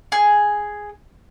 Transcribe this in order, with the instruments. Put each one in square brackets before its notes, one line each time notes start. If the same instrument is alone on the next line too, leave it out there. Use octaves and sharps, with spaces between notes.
[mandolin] G#4